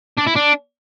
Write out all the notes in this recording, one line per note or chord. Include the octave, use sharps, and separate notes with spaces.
D4
E4
D4